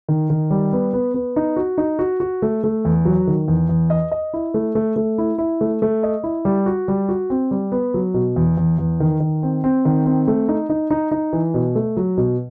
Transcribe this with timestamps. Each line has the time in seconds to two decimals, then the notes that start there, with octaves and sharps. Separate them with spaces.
0.08 D#3
0.30 D#3
0.51 G3
0.73 B3
0.93 B3
1.14 B3
1.36 D#4
1.56 F#4
1.78 D#4
1.99 F#4
2.20 F#4
2.42 A3
2.64 A3
2.85 E2
3.05 F#3
3.27 D#3
3.48 E2
3.69 E2
3.90 D#5
4.11 D#5
4.33 E4
4.54 A3
4.75 A3
4.96 A3
5.18 E4
5.38 E4
5.61 A3
5.82 A3
6.03 D#5
6.24 E4
6.45 G3
6.66 F#4
6.88 G3
7.09 F#4
7.30 C4
7.51 G3
7.72 B3
7.94 F#3
8.14 B2
8.36 E2
8.57 E2
8.78 E2
9.00 D#3
9.20 D#3
9.43 C4
9.64 C4
9.85 D#3
10.06 C4
10.28 A3
10.49 D#4
10.69 D#4
10.90 D#4
11.11 D#4
11.33 E3
11.54 B2
11.75 A3
11.97 F#3
12.18 B2